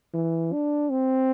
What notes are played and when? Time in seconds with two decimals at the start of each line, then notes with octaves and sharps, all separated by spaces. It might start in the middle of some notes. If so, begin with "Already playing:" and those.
0.14 E3
0.53 D4
0.91 C4